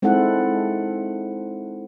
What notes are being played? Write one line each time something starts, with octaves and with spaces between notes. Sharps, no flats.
G#3 C4 D#4 E4 A4 F#5